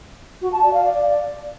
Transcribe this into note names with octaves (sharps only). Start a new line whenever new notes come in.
F#4
A5
D5
F5
D5